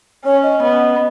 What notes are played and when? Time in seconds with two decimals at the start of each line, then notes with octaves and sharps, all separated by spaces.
0.25 C#4 C#5
0.43 D#5
0.62 B3